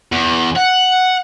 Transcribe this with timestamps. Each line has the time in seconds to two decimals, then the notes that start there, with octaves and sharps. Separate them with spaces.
0.12 E2
0.56 F#5